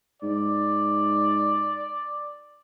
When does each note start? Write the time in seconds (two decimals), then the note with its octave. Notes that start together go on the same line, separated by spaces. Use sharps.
0.22 G#2 D5